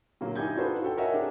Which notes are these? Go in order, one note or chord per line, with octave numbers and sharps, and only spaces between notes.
A#2 D3 F#3 A#3
D#4 E4 G4 G#5 G6 G#6
D4 F4 F#4 A4 B4 C5
F#4 A4 G5
A#4 C#5 D#5 E5 F#5 G#5
C4 D4 G4 G#4